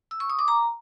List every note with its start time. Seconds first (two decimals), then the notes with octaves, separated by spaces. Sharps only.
0.11 E6
0.20 C#6
0.30 D#6
0.39 D6
0.48 A#5